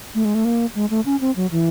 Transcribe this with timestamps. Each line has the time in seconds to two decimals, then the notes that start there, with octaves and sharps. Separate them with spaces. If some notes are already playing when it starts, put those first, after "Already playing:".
0.15 A3
0.25 G#3
0.35 A3
0.45 A#3
0.75 G#3
0.90 A3
1.06 C#4
1.21 C4
1.36 F#3
1.51 E3